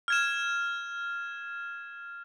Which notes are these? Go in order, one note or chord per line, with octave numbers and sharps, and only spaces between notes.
F6 G#6 E7